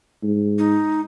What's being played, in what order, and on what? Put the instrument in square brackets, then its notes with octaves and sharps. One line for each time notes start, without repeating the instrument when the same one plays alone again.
[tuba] G#2
[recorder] D#4